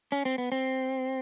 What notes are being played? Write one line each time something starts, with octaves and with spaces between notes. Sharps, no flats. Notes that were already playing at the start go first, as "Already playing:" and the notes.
C#4
C4
B3
C4